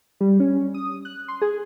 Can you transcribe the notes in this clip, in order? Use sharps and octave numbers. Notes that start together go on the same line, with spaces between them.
G3
C#4
D#6
F#6
C6
G#4